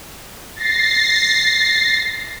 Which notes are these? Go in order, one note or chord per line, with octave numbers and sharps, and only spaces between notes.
A6 A#6 C7